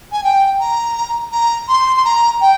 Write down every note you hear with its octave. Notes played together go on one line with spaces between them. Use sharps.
G#5
G5
A#5
A#5
C6
C6
A#5
G5